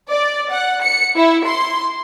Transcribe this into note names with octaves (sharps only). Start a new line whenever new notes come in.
D5
F#5
C#7
E4
C6